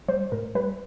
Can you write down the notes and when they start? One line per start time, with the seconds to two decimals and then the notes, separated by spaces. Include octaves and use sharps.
0.08 G3 C5
0.32 A2 A#4
0.55 G3 B4